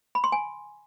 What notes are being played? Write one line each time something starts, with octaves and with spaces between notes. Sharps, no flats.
B5
C6
G#5